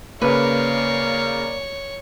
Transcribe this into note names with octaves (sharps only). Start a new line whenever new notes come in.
C#3 A#3 A#4 B4 C#5 D5 F5